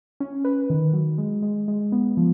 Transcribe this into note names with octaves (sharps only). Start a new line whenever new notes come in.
C#4
B4
D#3
F#3
G#3
G#3
G#3
B3
F3